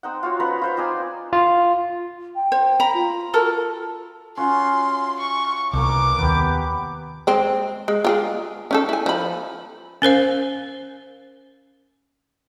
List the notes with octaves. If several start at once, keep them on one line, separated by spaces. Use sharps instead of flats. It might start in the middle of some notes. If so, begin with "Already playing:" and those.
C4 D#4 F#5
F4 F#4 C#5
C#4 B4 F#5 A#5
F4 C5 F5
C4 D#4 D5 G#5
F4
G5
C5
A#5 B5
F4
F#4 A4 A#4
C#4 F4 F#4 C6
C#6
C2 B2 A#3 A#4 D6
D#2 B3 G4
G#3 C4
G#3
F4 G4 G#4
C#4 D#4 A4
E4 G#5
F3 B5
C#4 A#4 C5 F5